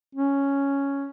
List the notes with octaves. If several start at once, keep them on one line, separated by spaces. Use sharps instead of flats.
C#4